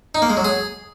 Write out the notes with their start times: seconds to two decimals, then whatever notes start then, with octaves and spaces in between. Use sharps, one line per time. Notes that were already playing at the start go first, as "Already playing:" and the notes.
0.15 D#4
0.22 A#3
0.30 G#3
0.37 F#3
0.45 G#4